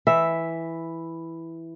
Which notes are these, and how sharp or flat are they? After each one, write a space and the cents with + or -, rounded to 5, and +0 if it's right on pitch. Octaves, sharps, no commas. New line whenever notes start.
E3 +0 E5 +0